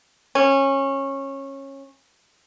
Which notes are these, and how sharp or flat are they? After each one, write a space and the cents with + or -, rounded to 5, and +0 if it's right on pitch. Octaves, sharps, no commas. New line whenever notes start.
C#4 -20